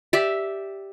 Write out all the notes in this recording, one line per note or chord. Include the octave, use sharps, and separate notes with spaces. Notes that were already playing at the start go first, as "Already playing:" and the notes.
G4 D5 E5